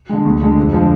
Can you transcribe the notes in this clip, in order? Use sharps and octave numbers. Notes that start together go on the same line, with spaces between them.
D3 G#3
D2
D3 G#3
F2
D3 F3 G#3